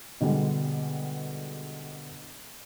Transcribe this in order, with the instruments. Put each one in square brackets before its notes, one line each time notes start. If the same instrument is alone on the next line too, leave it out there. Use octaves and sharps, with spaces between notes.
[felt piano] B2 D3 G3 G#3